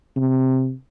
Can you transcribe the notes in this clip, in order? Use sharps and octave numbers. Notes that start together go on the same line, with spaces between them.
C3